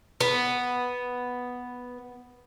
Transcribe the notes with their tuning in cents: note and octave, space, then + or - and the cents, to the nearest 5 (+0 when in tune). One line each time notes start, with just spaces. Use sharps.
B3 +0